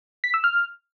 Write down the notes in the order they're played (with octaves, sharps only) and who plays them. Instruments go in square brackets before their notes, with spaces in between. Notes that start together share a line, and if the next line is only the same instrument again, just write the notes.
[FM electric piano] B6
E6
F6